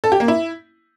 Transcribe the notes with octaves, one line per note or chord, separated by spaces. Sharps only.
A4
G4
A#3
E4